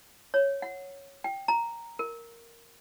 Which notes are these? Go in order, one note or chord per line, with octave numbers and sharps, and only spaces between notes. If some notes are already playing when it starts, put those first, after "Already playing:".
C#5
F#5
G5
A#5
A#4